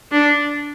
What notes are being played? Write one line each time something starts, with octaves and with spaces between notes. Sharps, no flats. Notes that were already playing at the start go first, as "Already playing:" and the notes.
D4